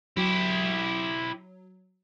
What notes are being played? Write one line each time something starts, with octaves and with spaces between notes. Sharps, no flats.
F#3 E4 G4